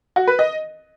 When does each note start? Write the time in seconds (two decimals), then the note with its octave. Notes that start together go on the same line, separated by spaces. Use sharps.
0.16 F#4
0.27 B4
0.39 D#5